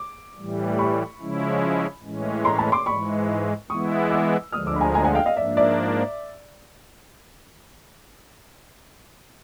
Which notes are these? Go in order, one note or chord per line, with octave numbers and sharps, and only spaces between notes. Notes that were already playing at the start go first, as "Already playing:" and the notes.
Already playing: D6
A2 E3 G3
B5 C#6
C#3 F3 G#3 C#4 E4
A2 E3 G#3 C#4
A#5 C6
A5 B5
C6 D6
G#2 E3 G#3 B5 C#6
E3 G#3 B3 E4 C#6 D#6
D6 E6
D2 D3 F3 G#3 D#6 F6
D6 E6
B5
G#5 A#5
G#5 A#5
F#5 G#5
F5 G5
D#5 F5
G#2 F3 A#3 D4 D5 E5
D5 E5